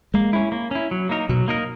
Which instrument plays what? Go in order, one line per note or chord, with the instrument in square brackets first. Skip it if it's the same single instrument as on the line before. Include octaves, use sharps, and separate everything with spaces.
[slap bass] G#3 [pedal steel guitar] A#3
[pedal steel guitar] C#4 E4
A#3
C#4 E4
F#3
A#3 D#4 A#4
[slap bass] B2 [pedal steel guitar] F#3
[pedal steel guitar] A#3 D#4 A#4